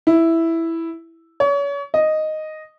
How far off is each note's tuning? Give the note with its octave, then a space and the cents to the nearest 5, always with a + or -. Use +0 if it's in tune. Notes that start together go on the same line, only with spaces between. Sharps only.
E4 +0
C#5 +35
D#5 -5